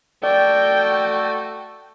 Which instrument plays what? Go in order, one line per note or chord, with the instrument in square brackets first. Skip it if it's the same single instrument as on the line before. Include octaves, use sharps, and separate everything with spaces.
[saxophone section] A3 F#4 A4 [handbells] D5 [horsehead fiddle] G5